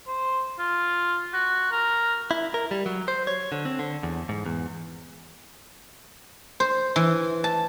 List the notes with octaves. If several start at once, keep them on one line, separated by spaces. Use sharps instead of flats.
C5
F4
F#4
A#4
E4
A#4
G3
F#3
C5
C#5
D3
C4
D3
E2
G#2
E2
C5
E3
A5